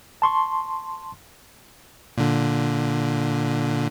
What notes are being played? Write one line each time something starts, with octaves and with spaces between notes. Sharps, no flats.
A5 C6 C#6
A#2 D3